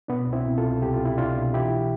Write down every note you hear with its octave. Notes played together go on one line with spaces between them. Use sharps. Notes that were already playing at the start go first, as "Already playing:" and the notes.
B2 B3 D4
C2
C4 E4
B2
F4 A4
C2
C2 G4
F4
B2 E4
C2 D4 F4
B2
E3 E4 G4